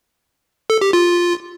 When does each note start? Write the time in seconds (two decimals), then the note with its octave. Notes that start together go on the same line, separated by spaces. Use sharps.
0.70 A4
0.81 G4
0.93 F4